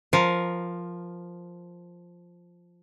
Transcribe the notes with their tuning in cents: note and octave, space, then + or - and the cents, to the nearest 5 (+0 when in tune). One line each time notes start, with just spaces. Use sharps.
F3 +0 A#4 +10